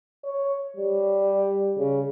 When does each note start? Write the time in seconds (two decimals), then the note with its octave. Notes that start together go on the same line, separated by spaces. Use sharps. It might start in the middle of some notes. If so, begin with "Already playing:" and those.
0.25 C#5
0.77 G3
1.78 C#3